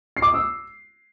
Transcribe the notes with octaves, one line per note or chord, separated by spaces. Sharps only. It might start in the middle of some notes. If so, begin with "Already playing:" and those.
C7
D6
D#6
E6